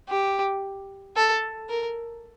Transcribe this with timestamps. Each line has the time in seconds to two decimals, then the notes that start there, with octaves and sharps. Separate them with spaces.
0.09 G4
1.16 A4
1.69 A#4